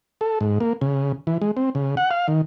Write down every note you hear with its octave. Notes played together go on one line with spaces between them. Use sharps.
A4
G#2
A#3
C#3
E3
G#3
C4
C#3
F#5
F5
D#3